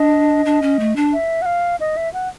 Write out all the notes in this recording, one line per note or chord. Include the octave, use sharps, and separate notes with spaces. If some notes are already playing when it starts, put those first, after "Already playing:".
Already playing: D4 D#5
D4
C#4
A3
D4
E5
F#5
F5
D#5
E5
F#5